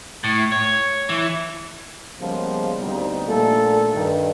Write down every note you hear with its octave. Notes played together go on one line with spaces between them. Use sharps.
A2
C#5
E3
C#3 F3 G3 G#3 A#3 B3
D2 B2 G3 C4 D#4
A#1 A#2 A3 A#3 A4 A#4
G2 D#3